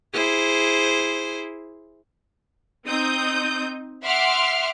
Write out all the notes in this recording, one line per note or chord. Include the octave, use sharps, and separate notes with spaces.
E4 G#4 C5
C4 D#4 D#6 G6
E5 F#5 C6 D6 F6